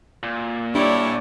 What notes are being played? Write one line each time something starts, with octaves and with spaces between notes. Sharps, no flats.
A#2
G3 D4 E4 C#5 D5